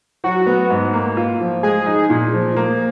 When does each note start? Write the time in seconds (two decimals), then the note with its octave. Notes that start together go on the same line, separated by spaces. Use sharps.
0.24 F#3 F#4
0.46 B3
0.70 G#2
0.93 A#3
1.17 F4
1.40 F3
1.63 G#3 G#4
1.86 D#4
2.10 A#2
2.33 F3
2.56 A#3